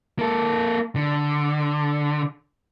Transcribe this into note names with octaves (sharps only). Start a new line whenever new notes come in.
A#3 A4
D3